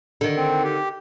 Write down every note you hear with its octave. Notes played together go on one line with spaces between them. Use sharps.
D3 D#3
C4
G4